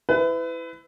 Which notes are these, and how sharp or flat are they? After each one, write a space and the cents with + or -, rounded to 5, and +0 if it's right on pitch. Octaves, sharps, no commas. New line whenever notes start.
E4 +0 B4 +30